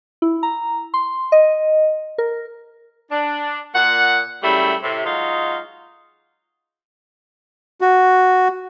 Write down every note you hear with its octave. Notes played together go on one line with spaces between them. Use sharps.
E4
A#5
C6
D#5
A#4
D4
A#2 F#5
F#2 C#3 G3 A3 E4
A2 C3
F#3 G#3 D#4 F4
F#4